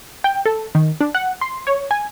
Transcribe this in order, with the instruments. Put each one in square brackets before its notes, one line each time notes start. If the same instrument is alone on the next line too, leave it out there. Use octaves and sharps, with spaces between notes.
[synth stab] G5
A4
D#3
D4
F#5
C6
C#5
G#5